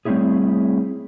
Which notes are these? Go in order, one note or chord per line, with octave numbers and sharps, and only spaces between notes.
G3 A3 C4 C#4 E4 G#4